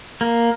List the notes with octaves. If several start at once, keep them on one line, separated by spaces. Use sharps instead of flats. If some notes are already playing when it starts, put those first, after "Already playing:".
A#3